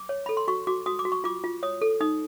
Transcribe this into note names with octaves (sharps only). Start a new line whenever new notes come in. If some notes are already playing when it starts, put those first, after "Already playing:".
Already playing: D6
C#5
A4 B5
C6
F#4 C#6
F#4 D6
F#4 D#6
D6
F#4
C#6
F4 D6
F4
C#5 D#6
A4
D#4 D#6